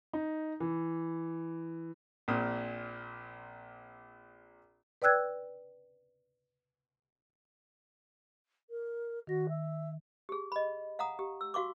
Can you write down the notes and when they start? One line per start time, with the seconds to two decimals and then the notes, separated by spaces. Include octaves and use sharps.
0.13 D#4
0.60 E3
2.28 A#1 A#2 C4 D#6
5.02 B4 D5 G5 E6 F#6 G#6
8.70 A#4
9.27 D#3 F#4 A#6
9.49 E5
10.29 G4 G#4
10.52 D#5 B5
10.99 F5 F#5 A#5 D#6
11.19 G4
11.41 E6
11.54 F#4 F5 C#6 D6